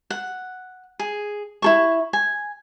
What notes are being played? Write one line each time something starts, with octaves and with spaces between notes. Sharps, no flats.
F#5
G#4
E4 A4 C#6
G#5